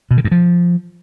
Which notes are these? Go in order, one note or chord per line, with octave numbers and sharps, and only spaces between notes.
B2
D#3
G2
F3